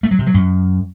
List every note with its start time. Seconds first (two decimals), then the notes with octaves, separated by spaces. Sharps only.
0.03 A3
0.11 F#3
0.19 C3
0.26 F#3
0.34 F#2